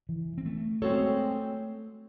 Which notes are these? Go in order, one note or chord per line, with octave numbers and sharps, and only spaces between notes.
E3
C4
A3
G#3 C4 F#4 A4 C#5